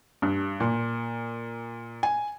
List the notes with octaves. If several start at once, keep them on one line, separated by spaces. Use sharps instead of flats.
G2
A#2
G#5